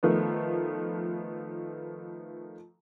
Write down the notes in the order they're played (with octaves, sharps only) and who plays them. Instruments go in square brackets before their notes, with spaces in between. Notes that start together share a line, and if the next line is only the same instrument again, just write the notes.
[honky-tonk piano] D#3 F3 A3 B3